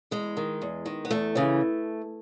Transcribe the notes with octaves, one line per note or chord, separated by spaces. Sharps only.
E2 G#3
D#3
E2
D#3
B3
E2 A3
C#3 E3